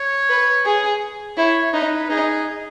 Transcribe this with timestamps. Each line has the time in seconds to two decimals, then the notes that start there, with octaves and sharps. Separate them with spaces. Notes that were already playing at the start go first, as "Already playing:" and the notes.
Already playing: C#5
0.30 B4
0.66 G#4
1.37 E4 C#5
1.73 D#4 B4
2.10 D#4 G#4